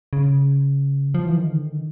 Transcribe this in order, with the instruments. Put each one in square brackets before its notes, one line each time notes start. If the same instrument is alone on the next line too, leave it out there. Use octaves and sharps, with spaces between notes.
[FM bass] C#3
F3
E3
D#3
D3
D#3